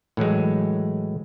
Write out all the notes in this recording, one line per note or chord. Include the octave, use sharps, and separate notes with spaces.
A2 E3 F#3 G#3